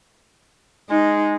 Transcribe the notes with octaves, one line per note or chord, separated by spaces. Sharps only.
G#3 D#4